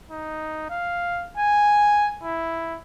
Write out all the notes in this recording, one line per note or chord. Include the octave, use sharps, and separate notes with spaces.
D#4
F5
G#5
E4